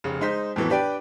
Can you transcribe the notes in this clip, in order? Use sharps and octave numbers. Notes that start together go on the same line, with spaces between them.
F1 C#3
G#3 D#4 C5 B6
F2 A2 E3 F#3 B3
D4 G4 B4 D5 G5